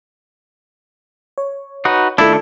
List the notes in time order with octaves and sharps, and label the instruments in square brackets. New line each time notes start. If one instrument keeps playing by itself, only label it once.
[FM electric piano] C#5
[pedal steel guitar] D#4 F#4 B4
[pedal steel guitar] D#3 A3 D4 [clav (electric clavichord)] E4 [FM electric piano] F4 A4